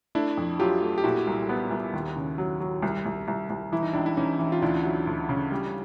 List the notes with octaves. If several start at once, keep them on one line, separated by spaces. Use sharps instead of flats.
A3 D4 E4
F2
F#3 F4 G4
A3
G4
A#2 E4 F#4
C2
B3
C2
D#2
C#3
F#3
F#3
C2
C2
C2
C2
E3 E4
D#4
C#2 D4 E4
E4
E3 C#4 D#4
E3
F4
D2 D4 E4
F#3
D2
C#3
G3